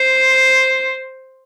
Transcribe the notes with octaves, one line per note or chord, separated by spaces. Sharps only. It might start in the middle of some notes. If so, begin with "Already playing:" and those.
Already playing: C5